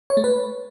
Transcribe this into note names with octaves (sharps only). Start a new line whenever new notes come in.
C#5
A3
B4